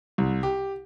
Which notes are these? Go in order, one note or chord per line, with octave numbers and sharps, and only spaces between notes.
C2
G4